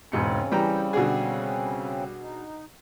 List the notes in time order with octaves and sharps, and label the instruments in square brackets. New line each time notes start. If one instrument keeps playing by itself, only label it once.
[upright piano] E1 G#2 C#7 [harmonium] C#3 C4 C#4
[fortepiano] E3 G5 A#5 [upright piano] G3
[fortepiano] B2 D3 G#4
[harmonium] D#4